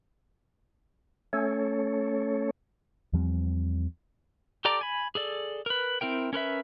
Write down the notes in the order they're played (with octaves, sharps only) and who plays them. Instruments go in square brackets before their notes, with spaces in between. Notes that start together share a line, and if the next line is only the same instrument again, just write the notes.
[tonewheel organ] A3 C#4 A4 C#5
[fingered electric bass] E2 F3 G3 C4
[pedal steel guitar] G4 A4 D5 A#5 D6
G#5 B5
G#4 A4 D5
A#4 B4
C4 E4 A#4 G5
C#4 A#4 B4 E5